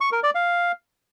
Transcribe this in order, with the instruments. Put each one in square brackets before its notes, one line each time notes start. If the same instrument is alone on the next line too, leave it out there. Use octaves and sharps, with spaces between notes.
[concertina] C#6
A#4
D5
F5